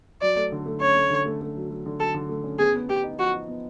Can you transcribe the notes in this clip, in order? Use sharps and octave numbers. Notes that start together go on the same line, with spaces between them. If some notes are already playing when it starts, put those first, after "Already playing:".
F#3 D5
A3
D3
A3
C#4 C#5
A3
D3
A3
A3
F#3
F#3
D3
F#3 A4
D3
A3
C#4
B3 G#4
B3
B3 G4
D#4
F3 F#4
D#4
B3